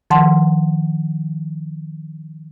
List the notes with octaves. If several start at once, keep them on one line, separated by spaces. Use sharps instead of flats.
D#3 F3 F#5 A5 C6